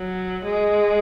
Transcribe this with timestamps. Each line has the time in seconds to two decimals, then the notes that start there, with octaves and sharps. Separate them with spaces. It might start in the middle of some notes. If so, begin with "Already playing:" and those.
Already playing: F#3
0.45 G#3